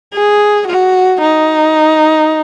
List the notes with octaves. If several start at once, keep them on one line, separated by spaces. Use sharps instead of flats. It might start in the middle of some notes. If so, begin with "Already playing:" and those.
G#4
F#4
D#4